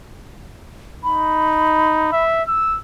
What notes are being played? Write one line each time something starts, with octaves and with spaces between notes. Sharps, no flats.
D#4 B5
E5
E6